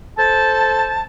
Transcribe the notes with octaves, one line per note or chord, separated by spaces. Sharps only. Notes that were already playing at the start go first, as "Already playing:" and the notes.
A4 C5 A5